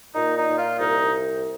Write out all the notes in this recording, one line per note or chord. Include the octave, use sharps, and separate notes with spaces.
A#2 D#4
D#4
A#2
F4
C2 D#4